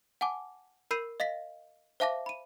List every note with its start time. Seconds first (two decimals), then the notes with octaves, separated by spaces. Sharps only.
0.21 F#5 G#5 A5 D6
0.91 A#4 B5 E6 G6 C7 D#7
1.20 D#5 F5 A#6 B6
2.00 C5 E5 F5 A5 D6 A#6
2.26 B5 D#7